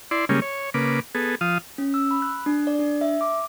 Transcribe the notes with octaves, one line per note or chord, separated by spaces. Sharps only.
E4 D5 C6
C#3 G3 G#3 A#3 C#4
C#5
C#3 A#3 B4 D6
B3 G#4 A4
F3 F5 D#6
C#4
E6
B5
F#6
D4
D5
D4
E5
D6